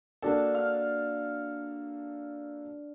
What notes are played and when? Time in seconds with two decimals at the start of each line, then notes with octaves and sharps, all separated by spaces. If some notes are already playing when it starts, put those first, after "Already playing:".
0.22 A#3 D4 F#4 A4 A5
0.55 F5